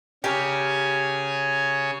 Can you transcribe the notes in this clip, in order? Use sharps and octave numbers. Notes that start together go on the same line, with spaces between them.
C#3 G4 A#4 C#5 G#5